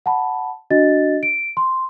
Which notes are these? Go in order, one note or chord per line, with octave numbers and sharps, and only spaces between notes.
F#5 A5 B5
D4 F#4 D#5 A6
D7
C6